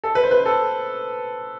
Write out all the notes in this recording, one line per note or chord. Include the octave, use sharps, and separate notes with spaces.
A4
B4
C5
B4
A4